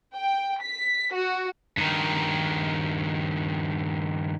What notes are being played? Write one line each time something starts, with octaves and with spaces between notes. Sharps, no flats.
G5
B6
F#4
G2 D#3